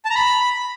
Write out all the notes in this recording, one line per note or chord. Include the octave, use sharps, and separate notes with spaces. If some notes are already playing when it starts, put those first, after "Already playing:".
A5
A#5
B5